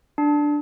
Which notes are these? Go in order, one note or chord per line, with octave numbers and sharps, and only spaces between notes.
D4